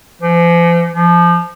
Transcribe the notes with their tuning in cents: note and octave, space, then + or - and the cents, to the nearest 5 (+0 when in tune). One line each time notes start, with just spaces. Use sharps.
F3 -40
F3 -15